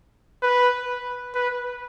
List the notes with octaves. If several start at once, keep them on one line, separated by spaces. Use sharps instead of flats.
B4
B4